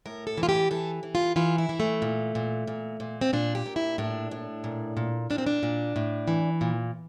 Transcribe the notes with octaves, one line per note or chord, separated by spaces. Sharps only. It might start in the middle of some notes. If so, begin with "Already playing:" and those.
A2 A#4
A4
E3
F4
G4
E3 A4
E3
F4
E3 F4
E4
E3
A3
A#2
A#2
A#2
A#2
C4
A#2 D4
G4
A#2
E4
A2 D4
A2
A#2
A#2
A#2 D4
C4
D4
A#2
A2
E3
A#2